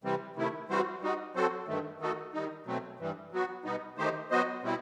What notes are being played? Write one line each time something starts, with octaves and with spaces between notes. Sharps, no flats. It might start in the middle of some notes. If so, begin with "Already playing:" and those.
C3 E3 G3 C4
C3 D#3 A3 E4
E3 G3 C4 F#4 C5
G3 D#4 F#4
F#3 C4 F#4 A4 C5
G2 D#3 A3
D#3 A3 D#4 F#4 A4
D#3 G3 D#4
B2 F#3 A3 C4
G2 E3 G3
F#3 B3 F#4
B2 G3 B3 D#4
D#3 A3 D#4 G4 C5
F#3 B3 F#4 C5 D#5
B2 G3 C4 E4